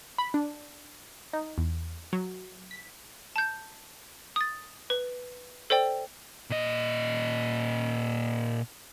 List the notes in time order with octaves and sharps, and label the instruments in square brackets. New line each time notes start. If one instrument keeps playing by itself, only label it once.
[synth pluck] B5
D4
D#4
E2
F#3
B6
[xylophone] A5 G6
D#6 A6
B4
A4 C5 D5 G5
[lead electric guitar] A#2 D#5